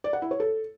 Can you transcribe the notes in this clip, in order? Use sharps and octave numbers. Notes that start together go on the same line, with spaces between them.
D5
F#5
E4
C#5
A4